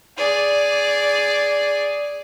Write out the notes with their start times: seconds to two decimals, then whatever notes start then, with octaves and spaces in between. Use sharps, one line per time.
0.17 G#4 D5